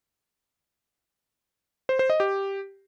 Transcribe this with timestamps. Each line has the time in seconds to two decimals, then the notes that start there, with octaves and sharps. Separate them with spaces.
1.89 C5
1.99 C5
2.10 D#5
2.20 G4